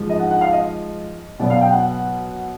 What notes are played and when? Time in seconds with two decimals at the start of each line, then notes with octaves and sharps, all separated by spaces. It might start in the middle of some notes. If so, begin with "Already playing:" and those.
Already playing: G#2 F3 G#3
0.09 D#5
0.19 F#5
0.31 F#5
0.41 F5
0.52 D#5
1.39 B2 F#3 B3 D5
1.50 F5
1.61 G5
1.72 F#5